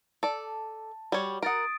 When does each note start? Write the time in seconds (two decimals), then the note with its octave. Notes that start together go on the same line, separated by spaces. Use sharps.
0.23 A4 D5 A5
1.12 G3 F#4 C#5
1.43 A#4 F#5 D#6 A6 D7